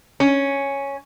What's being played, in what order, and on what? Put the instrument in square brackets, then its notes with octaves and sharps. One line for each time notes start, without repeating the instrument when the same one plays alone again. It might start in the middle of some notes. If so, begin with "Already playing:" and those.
[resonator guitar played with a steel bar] C#4